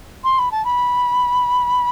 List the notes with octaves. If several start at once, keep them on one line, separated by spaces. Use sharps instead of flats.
C6
B5
A5
B5